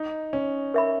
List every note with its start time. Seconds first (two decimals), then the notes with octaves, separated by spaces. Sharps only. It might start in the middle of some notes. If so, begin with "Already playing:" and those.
Already playing: D#4
0.33 C#4
0.74 A#4 E5 B5